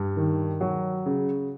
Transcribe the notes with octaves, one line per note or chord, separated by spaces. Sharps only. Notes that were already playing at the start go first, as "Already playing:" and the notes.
Already playing: G2
D#3
F#3
C#3